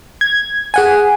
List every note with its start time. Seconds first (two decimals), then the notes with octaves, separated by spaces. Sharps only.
0.21 G#6
0.74 G#4 F#5 G#5